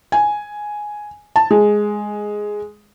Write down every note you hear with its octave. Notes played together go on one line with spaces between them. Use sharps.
G#5
A5
G#3